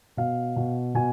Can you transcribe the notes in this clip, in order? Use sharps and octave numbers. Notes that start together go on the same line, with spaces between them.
B2 F5
B2
B2 G#5